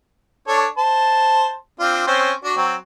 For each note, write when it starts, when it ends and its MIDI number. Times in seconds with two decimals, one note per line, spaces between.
0.48 0.66 62
0.48 0.66 69
0.48 0.66 73
0.78 1.54 72
0.78 1.54 81
1.80 2.05 60
1.80 2.05 62
1.80 2.05 65
2.07 2.33 60
2.07 2.33 61
2.07 2.33 72
2.44 2.57 62
2.44 2.57 66
2.57 2.75 54
2.57 2.75 60